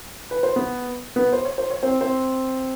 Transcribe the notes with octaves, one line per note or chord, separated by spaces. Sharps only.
B4
C5
B3 B4
B3 B4
C5
C#5
C5
C#5
C4 C5
C4 C5